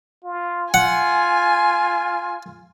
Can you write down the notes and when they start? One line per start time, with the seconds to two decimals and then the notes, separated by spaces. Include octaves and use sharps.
0.24 F4
0.74 F4 F#5 G#5